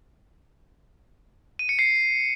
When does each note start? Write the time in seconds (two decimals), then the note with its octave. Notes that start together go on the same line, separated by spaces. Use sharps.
1.59 D#7
1.69 C#7
1.79 C7